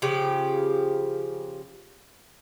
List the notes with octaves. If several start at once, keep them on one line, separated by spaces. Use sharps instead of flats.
C#3 F3 G4